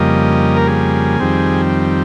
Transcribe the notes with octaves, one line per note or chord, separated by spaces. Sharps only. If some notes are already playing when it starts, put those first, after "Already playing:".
Already playing: F2 C#3 G3 A#3 D#5
A#4
G#4
F2 D#3 G3 C4